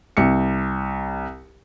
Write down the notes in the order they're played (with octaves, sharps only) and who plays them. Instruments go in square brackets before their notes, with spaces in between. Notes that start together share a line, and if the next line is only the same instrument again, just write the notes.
[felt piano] C2 C#7